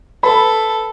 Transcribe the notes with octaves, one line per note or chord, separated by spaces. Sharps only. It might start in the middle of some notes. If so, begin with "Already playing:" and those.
A4 B4 B5